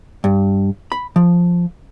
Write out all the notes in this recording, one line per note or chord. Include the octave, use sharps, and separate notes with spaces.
G2
B5
F3